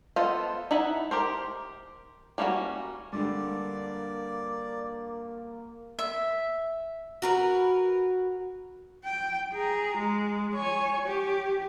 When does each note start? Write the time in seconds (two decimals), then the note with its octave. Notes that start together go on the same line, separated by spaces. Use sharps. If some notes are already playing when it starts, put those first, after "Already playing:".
0.16 B3 F4 A4 C5 D#5
0.71 D#4 E4 D#5 F#5 B5
1.11 G4 A#4 C5
2.38 G3 A#3 C#4 E4 F#4
3.13 G2 D3 G3 A#3 D5
5.99 E5
7.22 F#4 A#4 B4
9.05 G5
9.54 G#4 A#5
9.98 G#3
10.55 C#5 G#5
11.07 G4